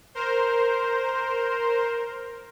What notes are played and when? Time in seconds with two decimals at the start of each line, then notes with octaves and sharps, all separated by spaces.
0.15 A#4 C5